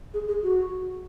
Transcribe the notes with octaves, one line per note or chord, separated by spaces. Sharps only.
G#4
G#4
F#4